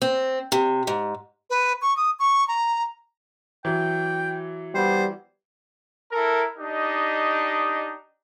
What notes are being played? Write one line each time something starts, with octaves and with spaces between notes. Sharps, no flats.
C4
C3
G#2
B4
C#6
D#6
C#6
A#5
E3 F#3 G5
G3 B3 C5
E4 A4 A#4
D4 D#4 G4 D#5